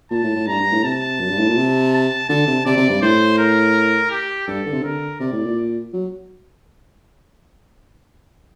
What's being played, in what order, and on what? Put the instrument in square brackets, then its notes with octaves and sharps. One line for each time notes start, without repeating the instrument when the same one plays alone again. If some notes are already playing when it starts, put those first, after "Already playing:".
[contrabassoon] A#2 [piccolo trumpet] A5
[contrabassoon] A2
A2
[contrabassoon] G2 [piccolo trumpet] A#5
[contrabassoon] G2
A2
[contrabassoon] C3 [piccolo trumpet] A5
[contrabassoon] F#2
G2
A2
A#2
C3
[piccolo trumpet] A5
[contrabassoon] D3 [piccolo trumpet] A5
[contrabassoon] C3
[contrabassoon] C3 [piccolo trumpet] D5
[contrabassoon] C3
G2
[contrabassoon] A2 [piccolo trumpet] C5
[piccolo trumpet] A#4
G4
[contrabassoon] G2 [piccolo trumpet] A4
[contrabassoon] D3
C3
[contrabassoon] D3 [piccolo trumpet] A#4
[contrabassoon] C3 [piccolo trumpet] D5
[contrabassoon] A2
A#2
F#3